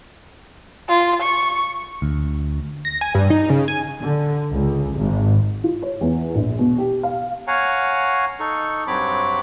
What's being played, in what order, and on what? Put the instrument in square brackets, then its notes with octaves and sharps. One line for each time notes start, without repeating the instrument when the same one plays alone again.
[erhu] F4
C#6
[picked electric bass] D2
[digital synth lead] A#6
G#5
G2
D#4
C#3
G#5
[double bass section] D3
C#2
G#1
[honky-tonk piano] F4
C#5
E2
A#1
B2
G4
F5
[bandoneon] C#5 F5 F#5 G#5 A#5
D#4 A4 C#6
G2 F#3 C4 C#5 B5 D6